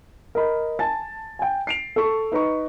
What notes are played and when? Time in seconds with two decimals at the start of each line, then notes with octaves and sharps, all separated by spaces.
0.35 A#4 D#5 B5
0.79 G#5 A5 A6
1.39 G5 G#5
1.67 C7 D7 F7
1.96 A4 C#6
2.32 D#4 B4 A#5 C#6